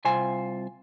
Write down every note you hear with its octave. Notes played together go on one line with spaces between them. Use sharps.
C2 C3 F4 C5 G#5